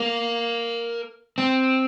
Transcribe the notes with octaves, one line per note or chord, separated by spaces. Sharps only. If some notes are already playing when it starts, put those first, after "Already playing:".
Already playing: A#3
C4